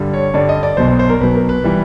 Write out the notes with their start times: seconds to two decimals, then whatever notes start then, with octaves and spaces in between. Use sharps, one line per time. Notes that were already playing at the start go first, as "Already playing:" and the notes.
Already playing: G2 D3 G3
0.13 C#5
0.34 G2 D3 G3 D5
0.49 D#5
0.63 D5
0.77 B1 B2 F#3 C5
0.88 C5
0.99 C5
1.10 A#4
1.20 B1 B2 F#3 B4
1.35 A#4
1.49 B4
1.64 E3 G3